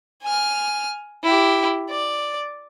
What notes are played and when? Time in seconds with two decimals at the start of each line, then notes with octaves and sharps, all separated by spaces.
0.23 G#5 F6
1.24 E4 G4
1.90 D5